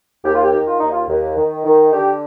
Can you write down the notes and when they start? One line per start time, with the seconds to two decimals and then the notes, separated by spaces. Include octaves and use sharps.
0.25 D#2 G4
0.34 F4
0.43 G4
0.53 D#3
0.66 F4
0.79 D#2 D#4
0.91 F4
1.08 D#2
1.36 D#3
1.64 D#3
1.92 D3 G4